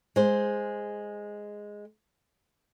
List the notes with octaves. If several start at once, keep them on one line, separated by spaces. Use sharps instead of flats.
G#3 C5